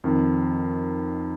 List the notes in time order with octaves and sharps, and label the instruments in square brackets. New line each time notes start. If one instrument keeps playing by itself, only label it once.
[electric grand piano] F2 D#3